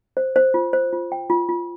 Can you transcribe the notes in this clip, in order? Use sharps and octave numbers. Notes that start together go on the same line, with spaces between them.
C5
C5
F4
C5
F4
G5
F4
F4